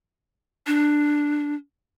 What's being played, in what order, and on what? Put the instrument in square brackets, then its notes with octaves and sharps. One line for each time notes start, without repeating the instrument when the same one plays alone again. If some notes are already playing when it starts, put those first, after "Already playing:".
[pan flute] D4